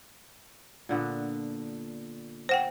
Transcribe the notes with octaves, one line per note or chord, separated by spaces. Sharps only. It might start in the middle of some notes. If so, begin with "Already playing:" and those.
A#2 D3 B3
C5 F#5 G5